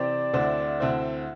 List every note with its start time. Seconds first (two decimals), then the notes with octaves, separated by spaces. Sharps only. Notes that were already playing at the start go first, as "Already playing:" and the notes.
Already playing: C3 E3 C4 G4 C5 D5
0.33 D2 D3 C4 E4 C5
0.80 D2 D3 C4 E4 C5